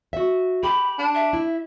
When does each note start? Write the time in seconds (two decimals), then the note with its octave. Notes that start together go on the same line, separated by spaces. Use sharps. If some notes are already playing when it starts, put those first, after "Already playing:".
0.13 F#4 E5
0.63 G4 B5
0.99 D4
1.15 E5
1.33 E4